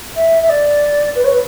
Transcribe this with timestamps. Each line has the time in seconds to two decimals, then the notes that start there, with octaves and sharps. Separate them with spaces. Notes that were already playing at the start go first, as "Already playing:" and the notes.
0.15 E5
0.42 E5
0.49 D5
1.15 B4
1.24 C#5
1.32 B4